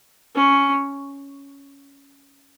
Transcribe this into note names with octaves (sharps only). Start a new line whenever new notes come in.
C#4